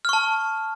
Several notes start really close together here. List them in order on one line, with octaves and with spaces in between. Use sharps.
F6 C#6 A5